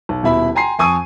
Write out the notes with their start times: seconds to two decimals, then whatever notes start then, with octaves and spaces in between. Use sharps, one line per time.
0.09 B1
0.23 D#1 B2 E4 B5
0.55 G5 G#5 A#5 C6 C7
0.79 F2 G#5 C#6 D#6 D#7